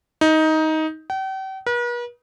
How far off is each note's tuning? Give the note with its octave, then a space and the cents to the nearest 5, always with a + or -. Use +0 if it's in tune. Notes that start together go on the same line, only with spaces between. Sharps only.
D#4 +15
G5 -40
B4 -45